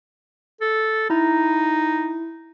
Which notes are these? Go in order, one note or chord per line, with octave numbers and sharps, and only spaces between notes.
A4
D#4 E4 A#5